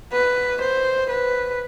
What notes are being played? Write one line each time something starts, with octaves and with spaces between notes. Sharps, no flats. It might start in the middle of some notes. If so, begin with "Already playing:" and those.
B4
C5
B4